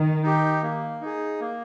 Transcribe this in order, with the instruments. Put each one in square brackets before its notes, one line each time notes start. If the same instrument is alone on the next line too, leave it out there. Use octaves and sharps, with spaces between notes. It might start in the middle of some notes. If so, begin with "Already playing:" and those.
Already playing: [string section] D#3
[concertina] D#4 G4
A#3
D#4 G#4
A#3